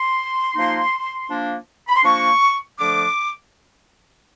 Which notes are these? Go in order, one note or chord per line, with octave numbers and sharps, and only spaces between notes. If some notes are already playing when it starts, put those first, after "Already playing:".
Already playing: C6
F3 A#3 D#4
F3 A#3 D4
B5
C6
F3 A#3 D4 C#6
D3 F3 A3 D4 D6